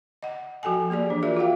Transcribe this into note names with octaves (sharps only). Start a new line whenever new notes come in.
D#5 F#5
F3 F#4 A4 G5 G#5
A#3 G4 G#4 D5
E3 D4
F4 F#4 G#4 A#4 D5 E5
F4 F#4 F5 G5